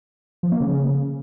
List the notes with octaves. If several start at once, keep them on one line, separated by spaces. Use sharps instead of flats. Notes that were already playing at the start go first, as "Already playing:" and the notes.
F3
A#3
C#3